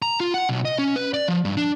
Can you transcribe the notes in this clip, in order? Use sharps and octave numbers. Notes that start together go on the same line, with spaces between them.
A#5
F4
F#5
B1
D#5
C#4
B4
D5
F3
G2
D4